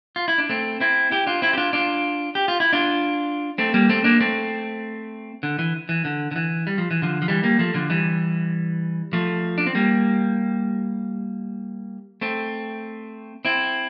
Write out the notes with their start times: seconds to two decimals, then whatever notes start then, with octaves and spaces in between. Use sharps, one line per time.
0.16 F4
0.28 E4
0.38 D4
0.49 A3 C4
0.80 C4 E4
1.11 E4 G4
1.27 D4 F4
1.42 C4 E4
1.53 G4
1.57 D4 F4
1.73 D4 F4
2.35 G4
2.48 F4
2.60 E4
2.73 D4 F4
3.58 A3 C4
3.74 G3 A#3
3.89 A3 C4
4.04 A#3 D4
4.20 A3 C4
5.43 D3
5.59 E3
5.89 E3
6.05 D3
6.31 D3
6.36 E3
6.67 G3
6.78 F3
6.91 E3
7.02 D3 F3
7.22 F3
7.28 E3 G3
7.43 G3 A#3
7.59 F3 A3
7.74 D3 F3
7.90 E3 G3
9.13 F3 A3
9.58 D4
9.67 C4
9.75 G3 A#3
12.21 A3 C4
13.45 C4 E4